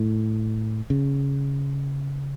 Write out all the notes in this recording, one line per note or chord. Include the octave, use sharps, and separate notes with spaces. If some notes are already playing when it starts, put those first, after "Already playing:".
Already playing: A2
C#3